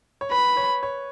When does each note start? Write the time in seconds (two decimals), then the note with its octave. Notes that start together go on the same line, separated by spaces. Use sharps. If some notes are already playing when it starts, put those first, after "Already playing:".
0.21 C#5
0.31 B4 B5
0.57 C#5
0.83 C#5